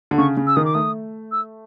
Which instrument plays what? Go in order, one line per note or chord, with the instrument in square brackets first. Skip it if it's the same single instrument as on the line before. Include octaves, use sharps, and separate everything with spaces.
[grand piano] D3
[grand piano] C#3 [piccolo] C#6
[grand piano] C#3
[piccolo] E6
[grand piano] D#3 [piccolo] D#6
[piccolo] D6
[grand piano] A3 [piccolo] D#6
[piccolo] E6